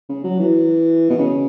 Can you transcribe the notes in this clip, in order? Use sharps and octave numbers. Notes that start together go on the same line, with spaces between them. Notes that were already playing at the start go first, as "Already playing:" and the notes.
C#3
F#3
E3
B2
C#3